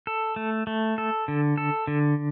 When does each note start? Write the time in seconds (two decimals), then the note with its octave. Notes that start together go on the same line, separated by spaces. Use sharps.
0.07 A4
0.36 A3
0.67 A3
0.98 A4
1.28 D3
1.58 A4
1.87 D3